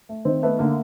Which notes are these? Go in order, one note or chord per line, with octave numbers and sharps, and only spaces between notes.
A3
D#3 C4
A3 B3
D3 A#3